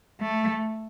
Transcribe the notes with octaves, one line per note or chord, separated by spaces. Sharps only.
A3